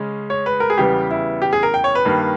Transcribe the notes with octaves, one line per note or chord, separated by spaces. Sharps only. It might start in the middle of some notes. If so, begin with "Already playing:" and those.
Already playing: C#3 G#3 C#4
C#5
B4
A#4
G#4
E2 C#3 G3 B3 G4
E4
G4
G#4
A#4
G5
C#5
B4
G2 D#3 A#3